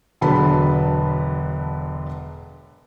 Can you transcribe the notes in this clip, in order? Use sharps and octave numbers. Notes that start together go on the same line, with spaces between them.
E1 D3 F#3 B3 A5 B5